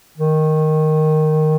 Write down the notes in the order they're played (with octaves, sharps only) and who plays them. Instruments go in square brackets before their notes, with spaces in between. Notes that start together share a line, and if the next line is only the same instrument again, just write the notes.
[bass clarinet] D#3